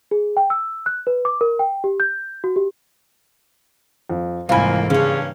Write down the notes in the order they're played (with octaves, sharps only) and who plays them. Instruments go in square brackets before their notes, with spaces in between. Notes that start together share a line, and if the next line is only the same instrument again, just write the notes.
[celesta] G#4
G5
E6
F#6
B4
D6
A#4
G5
G4
G6
F#4
G4
[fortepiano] F2
[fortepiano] C2 B5 [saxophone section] F2 A#3 [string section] G#2 E3 [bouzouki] F4 G#5
[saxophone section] G2 A#3 C#4 [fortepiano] C#3 [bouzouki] G#3 D4